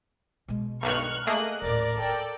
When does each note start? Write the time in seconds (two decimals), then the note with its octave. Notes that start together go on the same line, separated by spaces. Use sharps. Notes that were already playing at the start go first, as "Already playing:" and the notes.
0.48 B2 G#3
0.83 B1 G2 D#3 C#6 F6 F#6
1.27 A3 A#3 G#4 D#5 F#6
1.62 D#1 A2 A#4 D5
1.97 D4 A4 D5 G5